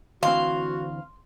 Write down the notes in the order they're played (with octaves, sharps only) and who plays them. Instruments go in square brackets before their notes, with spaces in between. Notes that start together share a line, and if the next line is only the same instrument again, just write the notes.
[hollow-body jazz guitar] D2 E3 C4 [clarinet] F#4 [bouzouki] F5 [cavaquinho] C6